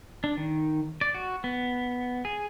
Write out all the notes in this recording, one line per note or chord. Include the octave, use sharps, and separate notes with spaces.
D4
D#3
D5
F#4
B3
G#4